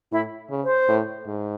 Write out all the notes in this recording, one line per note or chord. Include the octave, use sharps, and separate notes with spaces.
A2 E4
C#3
C5
A2
G#2